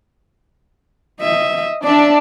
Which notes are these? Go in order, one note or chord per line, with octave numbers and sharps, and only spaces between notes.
D#5 E5
D4 D5 E5